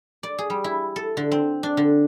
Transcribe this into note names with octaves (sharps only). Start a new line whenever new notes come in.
D5
G#4
G3
E4
A4
D3
C4
D4
D3